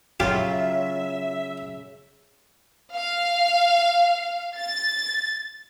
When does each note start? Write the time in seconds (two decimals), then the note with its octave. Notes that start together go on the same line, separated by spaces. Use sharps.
0.20 C#3 F#3 F4 G4 E5
2.94 F5
4.58 A6